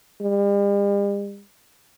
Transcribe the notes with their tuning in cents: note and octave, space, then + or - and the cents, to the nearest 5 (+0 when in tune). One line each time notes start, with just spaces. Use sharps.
G3 +45